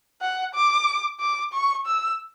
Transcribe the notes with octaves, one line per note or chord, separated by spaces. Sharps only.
F#5
D6
D6
C#6
E6